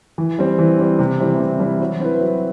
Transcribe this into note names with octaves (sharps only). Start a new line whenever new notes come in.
E3
G3 C4
E3
G3 C4
C3
E3 G3 C4 E4
C3
E3 G3 C4 E4
F#3
C4 E4 B4
F#3